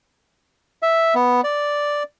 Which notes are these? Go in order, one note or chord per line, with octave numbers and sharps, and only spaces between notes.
E5
B3
D5